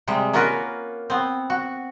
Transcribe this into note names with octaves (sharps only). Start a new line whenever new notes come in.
C3 G3 G#3
A#3 C#4 F4 F#4 A#4 B4
B3 C4
F#4